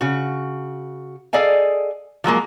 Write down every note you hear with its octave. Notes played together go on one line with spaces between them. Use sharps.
C#3 F#4
G#4 A4 D5 D#5 F5 G#5
F3 F#3 G#3 A#3